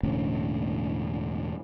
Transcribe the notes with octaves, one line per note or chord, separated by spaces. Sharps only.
E1 A2 D3 C#4